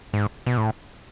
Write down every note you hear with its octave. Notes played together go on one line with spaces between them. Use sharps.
G#2
B2
A2